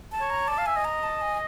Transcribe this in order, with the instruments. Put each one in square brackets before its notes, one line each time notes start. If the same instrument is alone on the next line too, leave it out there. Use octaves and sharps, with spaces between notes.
[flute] A5
[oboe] C#5
[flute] A#5
[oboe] D5 [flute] A5
[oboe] F5
[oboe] E5 [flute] G#5
[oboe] D#5
[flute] A#5
A5
G#5